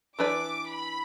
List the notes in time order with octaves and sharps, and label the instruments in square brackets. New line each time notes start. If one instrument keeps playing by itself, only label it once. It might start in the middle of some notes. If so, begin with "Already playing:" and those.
[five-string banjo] E3 D4 B4 D5 [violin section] D6
[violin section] B5